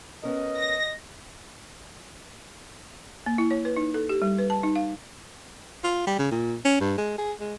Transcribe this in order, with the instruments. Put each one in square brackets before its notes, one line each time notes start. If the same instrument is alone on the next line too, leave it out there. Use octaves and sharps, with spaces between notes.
[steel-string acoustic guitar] B3 C#4 A#4 [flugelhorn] D#5
[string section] A#6
[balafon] A#3
E4
C#5
B4
D#4
A4
G4
G3
B4
A5
D#4
F5
[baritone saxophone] F4
G3
C#3
A#2
C#4
G2
G#3
G#4
G#3